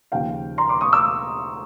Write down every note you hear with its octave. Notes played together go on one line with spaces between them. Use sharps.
D#2 C#3 F3 F5 G5
A#5 C6
C6 D6
C#6 D#6
D6 E6